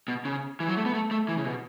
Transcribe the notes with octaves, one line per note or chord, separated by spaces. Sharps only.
B2
C#3
E3
F#3
A3
B3
A3
A3
E3
C#3
B2